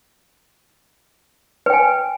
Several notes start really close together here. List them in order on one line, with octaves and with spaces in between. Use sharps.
B4 G5 G#5